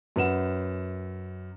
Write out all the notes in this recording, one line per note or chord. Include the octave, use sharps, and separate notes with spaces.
F#2 B4 F#5 E7